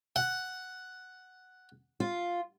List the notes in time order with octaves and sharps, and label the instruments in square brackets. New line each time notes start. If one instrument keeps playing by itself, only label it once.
[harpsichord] F#5
[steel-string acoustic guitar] F4